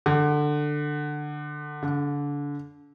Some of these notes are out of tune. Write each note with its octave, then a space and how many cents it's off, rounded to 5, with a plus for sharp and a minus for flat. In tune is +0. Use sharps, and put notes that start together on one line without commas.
D3 +15
D3 -30